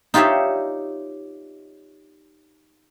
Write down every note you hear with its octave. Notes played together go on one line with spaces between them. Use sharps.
D#4 F4 G4 C#5 D5 E5